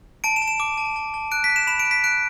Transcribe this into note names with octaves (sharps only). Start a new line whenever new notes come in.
A5 D7
E7
A5
E7
D6
A5
A5
A5
F#6 D7
B6
F#6
E7
B5 E7
D7
B5
B6
F#6 D7